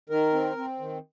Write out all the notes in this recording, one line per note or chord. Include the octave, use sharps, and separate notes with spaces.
D#3 A#4
C4
C4
D#3